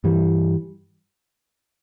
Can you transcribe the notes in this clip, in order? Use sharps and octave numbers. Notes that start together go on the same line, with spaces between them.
G2 E3 G3